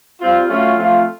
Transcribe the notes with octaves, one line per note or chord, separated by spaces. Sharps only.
G3 C4 F4
F#3 A3 C#4 F4
F3 A3 C4 F4